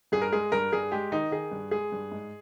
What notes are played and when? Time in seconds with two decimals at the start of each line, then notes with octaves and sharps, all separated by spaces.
0.12 G2 G#4
0.22 A#4
0.32 G#3 G#4
0.52 G2 A#4
0.72 G2 G#4
0.92 G#3 G4
1.12 D#3 D#4
1.31 D#3 G#4
1.52 G2
1.71 G#3 G#4
1.92 G2
2.12 G#2